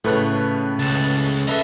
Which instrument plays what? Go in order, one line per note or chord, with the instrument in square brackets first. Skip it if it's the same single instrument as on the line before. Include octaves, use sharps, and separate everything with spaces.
[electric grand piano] A2 B4 F#6 [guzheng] C#3 A3
[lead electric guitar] C#2 [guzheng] A5
[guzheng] A4 B4 A#5 [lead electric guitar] D#5 E5